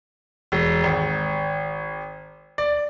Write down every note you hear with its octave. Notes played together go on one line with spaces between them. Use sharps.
E1
G#1
D5